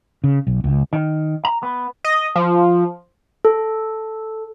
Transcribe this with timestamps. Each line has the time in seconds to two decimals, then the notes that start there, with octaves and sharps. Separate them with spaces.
0.24 C#3
0.47 B1
0.64 C#2
0.93 D#3
1.45 A#5
1.63 B3
2.05 D#5
2.36 F3
3.45 A4